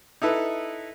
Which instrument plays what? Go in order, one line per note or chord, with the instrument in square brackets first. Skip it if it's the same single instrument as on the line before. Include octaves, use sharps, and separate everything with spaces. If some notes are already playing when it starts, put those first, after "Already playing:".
[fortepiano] D#4 E4 A4 B4